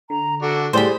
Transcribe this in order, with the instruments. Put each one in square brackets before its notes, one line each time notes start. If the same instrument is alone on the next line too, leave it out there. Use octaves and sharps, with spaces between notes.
[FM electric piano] D3 [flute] A#5
[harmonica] D4 F#4 [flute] A4
[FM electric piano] A2 G3 [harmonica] G#4 [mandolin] C5 B5 [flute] D5